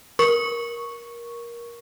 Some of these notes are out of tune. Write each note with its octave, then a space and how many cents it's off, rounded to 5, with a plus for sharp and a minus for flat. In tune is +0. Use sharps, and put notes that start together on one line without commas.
A#4 +15 C#6 +0